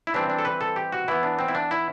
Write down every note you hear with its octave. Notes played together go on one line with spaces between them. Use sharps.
E4
E3 G3 C4 D4
D4
A4
B4
A4
G4
F#4
E3 B3 E4
D4
C4
E4
D4
E4